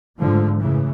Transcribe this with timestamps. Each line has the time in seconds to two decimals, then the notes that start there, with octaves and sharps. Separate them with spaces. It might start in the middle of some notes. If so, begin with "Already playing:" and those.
0.20 G#2 D3 F3 A3
0.59 F#2 A2 C#3 E3